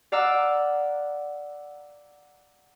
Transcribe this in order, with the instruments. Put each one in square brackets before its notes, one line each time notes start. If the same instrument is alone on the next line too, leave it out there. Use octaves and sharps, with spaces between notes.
[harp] D5 F5 F#5 A#5 D6 E6